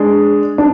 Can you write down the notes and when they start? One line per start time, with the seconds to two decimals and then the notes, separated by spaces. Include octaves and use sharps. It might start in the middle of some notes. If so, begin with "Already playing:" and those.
Already playing: G#3 D4
0.58 D4